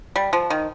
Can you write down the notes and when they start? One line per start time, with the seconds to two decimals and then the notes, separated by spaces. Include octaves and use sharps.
0.16 G3
0.33 F3
0.50 D#3